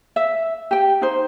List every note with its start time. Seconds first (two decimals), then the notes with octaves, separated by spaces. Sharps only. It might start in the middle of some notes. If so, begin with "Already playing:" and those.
0.16 E5
0.71 G4 G5
1.02 D#4 C5